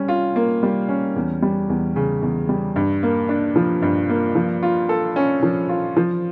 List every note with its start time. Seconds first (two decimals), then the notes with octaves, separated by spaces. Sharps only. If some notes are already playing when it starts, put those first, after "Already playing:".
Already playing: G3 C#4
0.08 F4
0.36 A#3
0.63 G3
0.88 C#4
1.16 E2
1.42 G3
1.69 E2
1.96 C#3
2.22 E2
2.49 G3
2.76 G2
3.03 A#3
3.29 D4
3.56 F3
3.82 G2
4.09 A#3
4.35 F3
4.63 F4
4.89 A4
5.16 C#4
5.43 F3
5.69 F4
5.97 F3